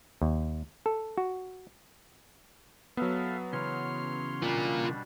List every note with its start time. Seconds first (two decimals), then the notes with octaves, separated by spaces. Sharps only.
0.22 D#2
0.86 A4
1.18 F#4
2.97 F#3 B3 A4 E5 F5
3.53 C#3 E3 C#4 C#5 C6 F6
4.42 B2 G3 D4 F4 A#4